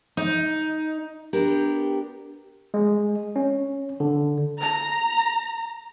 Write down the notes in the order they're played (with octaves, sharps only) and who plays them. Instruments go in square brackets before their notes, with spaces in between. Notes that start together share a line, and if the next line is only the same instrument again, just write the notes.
[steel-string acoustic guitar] D#4
B3 D4 G4 A#4
[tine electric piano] G#3
C#4
D3
[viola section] A#5